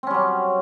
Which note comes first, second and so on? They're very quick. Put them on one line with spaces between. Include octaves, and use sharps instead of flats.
C4 C#4 G3 F#3